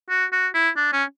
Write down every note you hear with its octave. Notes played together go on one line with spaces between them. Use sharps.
F#4
F#4
E4
D4
C#4